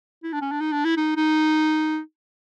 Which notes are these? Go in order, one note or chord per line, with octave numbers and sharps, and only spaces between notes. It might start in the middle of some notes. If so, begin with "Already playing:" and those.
E4
D4
C#4
D4
D#4
D4
E4
D#4
D#4